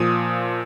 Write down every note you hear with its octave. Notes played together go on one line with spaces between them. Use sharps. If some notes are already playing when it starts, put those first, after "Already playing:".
Already playing: A#2 F3 D#6